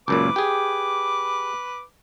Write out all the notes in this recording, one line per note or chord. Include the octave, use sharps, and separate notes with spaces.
C#2 F#2 A#2 B4 D6
G4 G#4